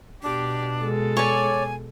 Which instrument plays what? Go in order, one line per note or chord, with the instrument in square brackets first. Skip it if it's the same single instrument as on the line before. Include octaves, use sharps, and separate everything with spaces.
[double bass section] B2 [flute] D4 [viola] G4
[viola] G#3 A4
[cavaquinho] C#5 D5 [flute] G#5